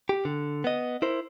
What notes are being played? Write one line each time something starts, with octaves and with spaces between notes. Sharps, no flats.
G4
D3
B3 D#5
E4 A#4 C5